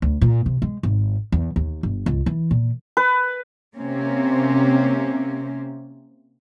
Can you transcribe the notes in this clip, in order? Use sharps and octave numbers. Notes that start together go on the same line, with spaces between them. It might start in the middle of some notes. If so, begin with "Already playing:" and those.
D2
A#2
C3
G#3
G#1
E2
D#2
G1
C#2
E3
A#2
B4
C3 A#3 C4 C#4